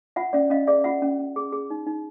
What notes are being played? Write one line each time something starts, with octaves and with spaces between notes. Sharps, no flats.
F4 E5 F#5
C#4 D5 E5
C#4 D#5 F5
G#4 D5 E5
F4 E5 F#5
C#4
C#4
G#4
G#4
D#4
D#4